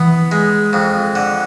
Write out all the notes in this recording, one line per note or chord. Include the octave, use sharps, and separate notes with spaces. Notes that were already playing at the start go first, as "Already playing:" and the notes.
Already playing: E3 B3
G#3
F2
D3